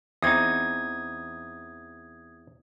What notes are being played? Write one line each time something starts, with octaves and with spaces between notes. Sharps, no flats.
E2 C4 D#4 D#6 G#6